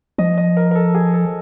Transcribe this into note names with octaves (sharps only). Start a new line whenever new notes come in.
F3 D#5
D#5
A#4
A#4
A4
G#4
A4